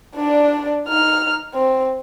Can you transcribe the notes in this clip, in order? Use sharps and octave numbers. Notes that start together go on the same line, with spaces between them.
D4 D5
D#4 F6
C4